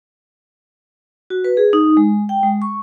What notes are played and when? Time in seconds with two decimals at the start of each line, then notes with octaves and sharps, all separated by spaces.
1.30 F#4
1.44 B4
1.57 G#4
1.73 D#4
1.97 G#3
2.29 G5
2.43 G#3
2.62 C#6